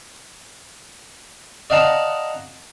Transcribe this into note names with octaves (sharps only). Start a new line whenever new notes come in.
D5 D#5 F5 F#5 A5 A#5